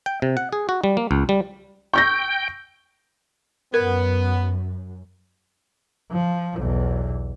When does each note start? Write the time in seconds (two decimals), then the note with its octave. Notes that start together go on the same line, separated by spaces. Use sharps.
0.06 G5
0.22 C3
0.37 F#5
0.53 G#4
0.69 F#4
0.84 G3
0.97 A#3
1.11 C#2
1.29 G3
1.94 G5 C#6 G6 A#6
3.74 F#2 B3 A#4
6.12 F3
6.57 B1 E2